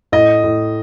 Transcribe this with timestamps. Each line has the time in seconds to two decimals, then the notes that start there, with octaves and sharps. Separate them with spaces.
0.12 A2 D#5
0.44 A2